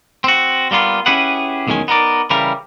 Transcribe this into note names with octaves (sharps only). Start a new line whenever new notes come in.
C4 F#4
G3 A#3 B3 F4
C#4 E4 G4 G#4 B4 F#5
B1 E2 D#3 G#3 C#4 G#5
B3 D#4 A#4 D5
C#3 E3 G3 A#4